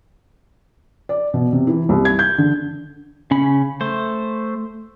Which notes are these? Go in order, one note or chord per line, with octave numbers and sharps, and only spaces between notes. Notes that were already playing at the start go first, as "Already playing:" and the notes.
D5
B2
C3
E3
C2
G#6
G6
D3
C#3 C#4 B5
A3 C5